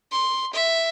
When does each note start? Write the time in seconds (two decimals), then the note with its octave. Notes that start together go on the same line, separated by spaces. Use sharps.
0.12 C6
0.53 E5